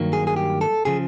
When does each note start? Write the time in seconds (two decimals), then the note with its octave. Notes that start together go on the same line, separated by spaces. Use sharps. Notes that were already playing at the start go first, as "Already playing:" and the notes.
Already playing: G2 D#3 F#3 A#3
0.13 G#4
0.27 G#4
0.36 G4
0.61 A4
0.85 C#3 F3 G#4